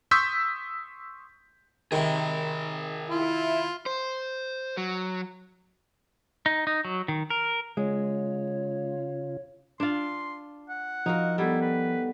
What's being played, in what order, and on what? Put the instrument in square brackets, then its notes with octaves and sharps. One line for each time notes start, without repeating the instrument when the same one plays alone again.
[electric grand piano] C6 C#6 D#6 E6 G6 B6
[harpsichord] C3 D#3 [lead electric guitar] G#4 A#4
[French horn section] E4 [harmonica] F4
[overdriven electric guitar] C5
F#3
[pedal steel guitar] D#4
D#4
F#3
D#3
A#4
[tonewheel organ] C#3 F4 [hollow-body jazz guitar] G#3 [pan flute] C#5
[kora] D4 F4 [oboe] C6
[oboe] F#5
[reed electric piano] F3 [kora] D#4 F#4 A#4 [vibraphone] D#5 F5
[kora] G3 [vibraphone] B3 A4 F#5 [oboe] E4
[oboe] B4